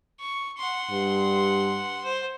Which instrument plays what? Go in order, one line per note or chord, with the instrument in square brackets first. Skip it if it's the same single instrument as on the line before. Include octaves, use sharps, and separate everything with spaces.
[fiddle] C#6
F#5 C6
[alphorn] G2
[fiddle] C5